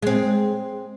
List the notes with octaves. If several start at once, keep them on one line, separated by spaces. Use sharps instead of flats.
G#3 C4